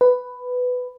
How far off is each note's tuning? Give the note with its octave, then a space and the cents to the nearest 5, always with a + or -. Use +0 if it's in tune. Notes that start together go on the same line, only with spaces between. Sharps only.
B4 +10